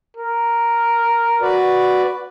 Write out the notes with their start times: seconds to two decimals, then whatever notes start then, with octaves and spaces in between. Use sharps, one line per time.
0.17 A#4
1.41 F#4 B4 D5